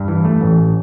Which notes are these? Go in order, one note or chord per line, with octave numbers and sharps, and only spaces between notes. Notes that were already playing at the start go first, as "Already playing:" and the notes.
Already playing: G2
E3
A3
A1